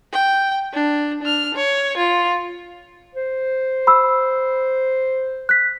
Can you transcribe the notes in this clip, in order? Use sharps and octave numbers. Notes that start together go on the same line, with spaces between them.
G5
D4
D4 F6
C#5
F4
C5
B5 E6
F#6 B6